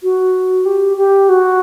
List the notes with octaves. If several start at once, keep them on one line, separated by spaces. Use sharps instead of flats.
F#4
G4
G4
F#4